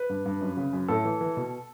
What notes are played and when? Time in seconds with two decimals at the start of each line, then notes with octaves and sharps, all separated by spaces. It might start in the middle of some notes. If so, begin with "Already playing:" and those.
Already playing: B4
0.10 G2
0.25 G2
0.41 F#2
0.57 C#3
0.73 F#2
0.88 A2 A4
1.05 E3
1.21 E3
1.37 B2